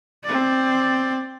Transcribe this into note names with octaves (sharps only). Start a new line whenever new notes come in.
C4 D5